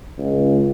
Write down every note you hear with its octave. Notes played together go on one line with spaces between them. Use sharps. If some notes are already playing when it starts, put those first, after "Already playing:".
C#2